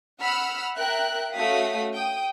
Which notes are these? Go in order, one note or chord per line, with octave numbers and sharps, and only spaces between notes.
F#5 B5 E6 F6
A#4 E5 G5 F#6
A3 C#4 F#4 F5 D#6 B6
G5 D#6